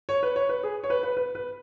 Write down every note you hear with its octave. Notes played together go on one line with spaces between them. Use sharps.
C#5
B4
C#5
B4
G#4
C#5
B4
B4
B4
B4